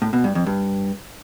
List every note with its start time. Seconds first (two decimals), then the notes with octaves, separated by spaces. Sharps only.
0.02 A2
0.13 B2
0.24 G2
0.35 F2
0.46 G2